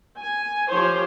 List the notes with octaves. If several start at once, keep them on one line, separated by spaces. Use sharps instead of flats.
G#5
F3 G4 C5 C#5